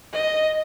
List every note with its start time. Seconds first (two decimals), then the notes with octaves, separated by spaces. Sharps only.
0.13 D#5